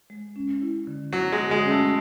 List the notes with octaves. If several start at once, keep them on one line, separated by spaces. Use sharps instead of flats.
G#3
C#4
E4
D3
D3 F#3
G#3
D3
G#3
C#4
A3